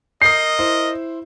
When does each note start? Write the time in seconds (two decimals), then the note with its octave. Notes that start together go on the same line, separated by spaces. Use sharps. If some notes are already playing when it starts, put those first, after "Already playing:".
0.22 A#4 D#5 D#6 G6 C7
0.59 E4 C5